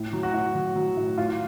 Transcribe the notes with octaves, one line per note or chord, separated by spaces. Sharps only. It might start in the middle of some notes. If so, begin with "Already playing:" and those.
Already playing: A2
F#3
F#4
A2
F#3
F#3
A2
A2 F4